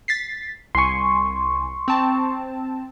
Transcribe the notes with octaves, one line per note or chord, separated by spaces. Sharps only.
A6 B6 C7
C2 G#5 C6 C#6
C4 A5